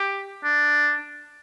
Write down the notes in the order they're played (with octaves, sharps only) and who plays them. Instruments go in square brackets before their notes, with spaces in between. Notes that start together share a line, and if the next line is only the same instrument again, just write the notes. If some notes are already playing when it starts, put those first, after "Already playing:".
Already playing: [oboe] G4
D4